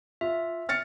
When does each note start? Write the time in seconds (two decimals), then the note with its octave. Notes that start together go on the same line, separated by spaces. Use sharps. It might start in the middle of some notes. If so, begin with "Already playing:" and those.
0.21 F4 E5
0.69 F6 A6 C#7